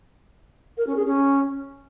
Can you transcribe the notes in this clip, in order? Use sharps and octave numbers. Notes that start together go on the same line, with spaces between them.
A#4
C#4
G#4
C#4